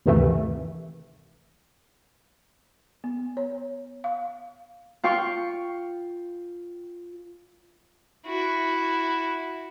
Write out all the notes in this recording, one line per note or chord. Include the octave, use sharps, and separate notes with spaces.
D2 G2 C3 D#3 E3 A3
B3
C#5
F5
F4 F5 G5 C#6
E4 F#4